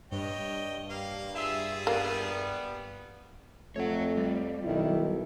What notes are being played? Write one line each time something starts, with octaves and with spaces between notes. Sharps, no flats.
G2 C#5 D#5 G5
A#3 F5
E4 F4 G#4 E5
G3 A#3 B3
F2 A3 C#5 F#5
G3
B1 D#3 E4